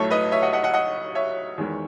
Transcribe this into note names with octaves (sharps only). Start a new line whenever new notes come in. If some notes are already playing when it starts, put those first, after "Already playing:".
Already playing: B1 A2 F#3 A3 A4 C#5
B4 D#5
C#5 E5
D#5 F#5
D#5 F#5
D#5 F#5
D#5 F#5
C#5 E5
E2 D#3 G#3